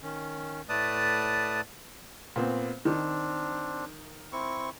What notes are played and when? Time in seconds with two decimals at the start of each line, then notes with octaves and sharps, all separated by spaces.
0.03 D#3 C#4
0.69 A2 A3 B4 D5 A5 D#6
2.36 A#2 B3 C4
2.85 D#3 C4 D4
4.32 C4 E4 C#6